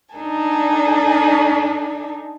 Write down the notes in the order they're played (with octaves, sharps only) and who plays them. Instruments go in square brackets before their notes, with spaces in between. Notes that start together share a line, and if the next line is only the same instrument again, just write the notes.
[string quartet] D4 D#4 A4 G#5